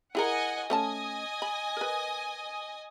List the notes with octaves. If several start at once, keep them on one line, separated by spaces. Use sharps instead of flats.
E4 G#4 A#4 D#5 F#5 G#5
A3 C#4 D#5 G#5 A5 D#6
B5
A#4 B4